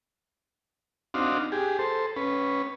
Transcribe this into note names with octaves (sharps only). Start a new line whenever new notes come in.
C4 D4 D#4 F#4 F5
G4 G#4
A4 C5
C#4 B4